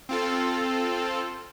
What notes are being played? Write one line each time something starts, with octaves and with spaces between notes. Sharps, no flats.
C4 F4 A4